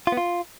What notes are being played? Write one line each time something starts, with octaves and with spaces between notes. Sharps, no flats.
F4
B3
F4